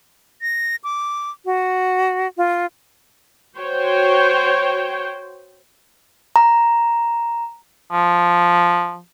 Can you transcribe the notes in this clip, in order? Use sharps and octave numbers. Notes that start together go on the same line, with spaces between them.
A#6
D6
F#4
F4
F#4 C5 C#5 G5
A#5
F3